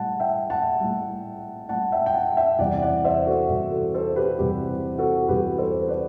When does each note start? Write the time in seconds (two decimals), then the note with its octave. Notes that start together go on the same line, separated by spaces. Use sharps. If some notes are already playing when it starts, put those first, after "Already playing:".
Already playing: A2 G3 F#5 A5
0.20 E5 G5
0.50 F#5 A5
0.80 A2 G3
1.69 A2 G3 F#5 A5
1.92 E5 G5
2.06 G5
2.14 F#5 A5
2.37 E5 G5
2.59 E2 C3 G3 D5 F#5
2.82 D5 F#5
3.04 C5 E5
3.26 F#4 A4
3.49 E2 C3 G3
3.72 F#4 A4
3.94 A4 C5
4.16 G4 B4
4.39 E2 C3 G3 G4
4.98 F#4 A4
5.29 E2 C3 G3 G4 B4
5.58 A4 C5
5.88 B4 D5